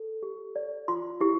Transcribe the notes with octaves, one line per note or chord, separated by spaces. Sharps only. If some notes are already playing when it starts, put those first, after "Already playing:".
Already playing: A4
G4
D5
F4 C6
E4 G4